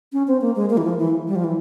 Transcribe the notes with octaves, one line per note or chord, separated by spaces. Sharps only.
C#4
C4
A#3
G#3
A#3
E3
F3
E3
G3
F3
E3